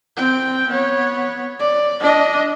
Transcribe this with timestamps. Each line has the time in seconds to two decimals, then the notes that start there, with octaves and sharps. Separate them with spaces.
0.17 C4 G5
0.68 B3 C#5
1.60 D5
2.00 D4 D#5